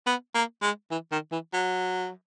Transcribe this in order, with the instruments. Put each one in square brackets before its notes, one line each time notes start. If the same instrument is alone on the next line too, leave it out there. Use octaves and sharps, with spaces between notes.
[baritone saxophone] B3
A#3
G#3
E3
D#3
E3
F#3